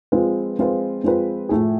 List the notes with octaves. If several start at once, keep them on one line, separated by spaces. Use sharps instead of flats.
F3 G#3 C4 F4 B4
F3 G#3 C4 F4 B4
F3 G#3 C4 F4 B4
A2 F3 A3 E4 G#4